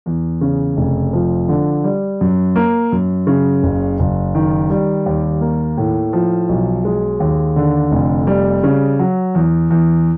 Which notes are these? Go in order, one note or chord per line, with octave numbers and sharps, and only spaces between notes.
E2
C#3
F1
F3
D3
G3
F#2
A#3
F#2
C#3
F#1
F#1
D#3
G3
D#2
A#3
A2
F3
B1
G#3
D#2
D3
F1
G3
C#3
F#3
E2
E2